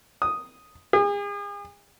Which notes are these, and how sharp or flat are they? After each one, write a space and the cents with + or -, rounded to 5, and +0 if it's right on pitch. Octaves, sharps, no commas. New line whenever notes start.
D#6 +0
G#4 -40